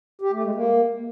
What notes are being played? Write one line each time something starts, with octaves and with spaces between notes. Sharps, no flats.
G4
A3
G#3
A#3